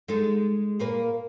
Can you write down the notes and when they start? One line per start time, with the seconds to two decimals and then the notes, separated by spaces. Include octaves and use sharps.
0.08 G#3 D#4 A4
0.79 A#2 A#3 B4